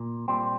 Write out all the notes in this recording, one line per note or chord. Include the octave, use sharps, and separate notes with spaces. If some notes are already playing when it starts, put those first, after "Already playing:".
Already playing: A#2
A#2 G3 C4